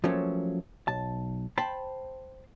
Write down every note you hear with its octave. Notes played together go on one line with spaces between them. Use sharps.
F3 F#3 A3 A#3 C#4
B1 A5
C5 G5 A5 B5